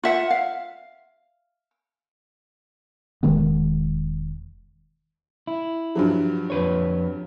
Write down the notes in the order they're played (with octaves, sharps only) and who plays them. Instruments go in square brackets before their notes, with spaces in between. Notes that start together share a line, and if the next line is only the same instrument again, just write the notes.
[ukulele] F4 E5 F#5
F5
[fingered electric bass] E1 D#3 G#3 B3
[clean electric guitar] E4
[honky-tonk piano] G2 F3 F#3
[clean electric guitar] F2 B4 C#5